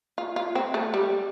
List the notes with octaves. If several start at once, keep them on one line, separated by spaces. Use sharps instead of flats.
F4
F4
C4
A3
G3